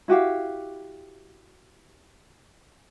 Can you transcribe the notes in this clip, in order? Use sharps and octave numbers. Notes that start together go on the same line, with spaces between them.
E4 F#4 G4 F5